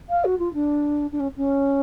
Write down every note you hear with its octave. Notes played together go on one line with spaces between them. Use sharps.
F5
F#4
F4
D4
D4
C#4
C#4